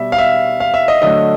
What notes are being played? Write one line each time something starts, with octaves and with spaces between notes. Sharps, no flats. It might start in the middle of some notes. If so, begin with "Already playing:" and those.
Already playing: B2 G3 E5
F5
E5
F5
E5
D#5
D3 F#3 A3 D#5